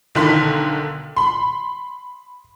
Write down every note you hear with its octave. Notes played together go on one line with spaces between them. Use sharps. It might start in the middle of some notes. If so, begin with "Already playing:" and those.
B1 D3 D#3 C6 B6
B5 C6